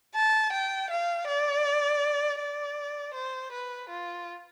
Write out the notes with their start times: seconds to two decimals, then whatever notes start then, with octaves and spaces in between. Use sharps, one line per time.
0.15 A5
0.52 G5
0.90 F5
1.27 D5
2.39 D5
3.14 C5
3.52 B4
3.89 F4